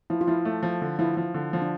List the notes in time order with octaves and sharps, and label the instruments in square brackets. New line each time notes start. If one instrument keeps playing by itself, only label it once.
[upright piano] F3 [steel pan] E4
[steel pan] F4
[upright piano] F3 [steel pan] E4
[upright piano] A3
F3
D3
[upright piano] F3 [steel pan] E4
[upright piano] F3
D3
F3
[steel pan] D4